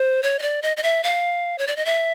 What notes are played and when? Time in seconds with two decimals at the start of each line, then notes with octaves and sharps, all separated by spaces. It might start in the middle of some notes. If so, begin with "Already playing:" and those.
Already playing: C5
0.23 C#5
0.39 D#5
0.42 D5
0.62 D#5
0.77 D#5
0.83 E5
1.03 F5
1.58 C#5
1.67 D5
1.76 D#5
1.85 E5